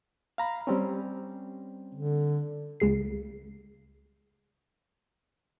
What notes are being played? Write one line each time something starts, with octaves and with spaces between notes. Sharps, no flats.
F5 A#5 B5
G3 C4 C#4
D3
C#2 C#3 C7